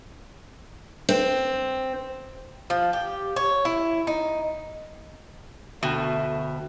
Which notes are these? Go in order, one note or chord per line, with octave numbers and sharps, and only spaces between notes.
C4
F3
G4
C#5
E4
D#4
D2 B2 A3 E5 G5